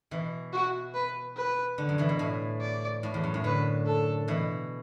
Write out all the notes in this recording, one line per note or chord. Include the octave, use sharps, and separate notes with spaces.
B2 E3
F#4
B4
B4
D3
F#2
B2 E3
B2
A2
D5
A2
E2
F#2
A2
D3 B4
A4
B2 E3